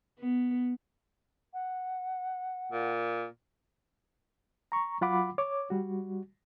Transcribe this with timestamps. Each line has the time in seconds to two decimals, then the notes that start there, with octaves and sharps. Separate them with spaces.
0.19 B3
1.54 F#5
2.71 A#2
4.72 A#5 C#6
5.01 F#3 F4 F#5 B5 D6
5.38 C#5 D6
5.70 G3 F#4